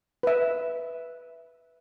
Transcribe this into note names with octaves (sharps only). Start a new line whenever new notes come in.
B4 E5